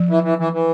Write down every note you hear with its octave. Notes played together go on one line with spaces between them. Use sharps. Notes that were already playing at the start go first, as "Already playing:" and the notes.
Already playing: F3
E3
E3
E3
E3